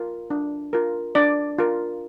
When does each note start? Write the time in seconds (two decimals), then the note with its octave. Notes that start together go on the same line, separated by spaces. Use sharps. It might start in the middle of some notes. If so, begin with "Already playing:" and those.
Already playing: F4 A#4
0.30 D4
0.73 F4 A#4
1.15 D4 D5
1.58 F4 A#4